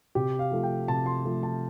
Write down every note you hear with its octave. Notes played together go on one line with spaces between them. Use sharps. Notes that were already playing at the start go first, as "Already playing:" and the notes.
C3 G4
F5
F3 A3
G5
C3 A5
C6
F3 A3
A5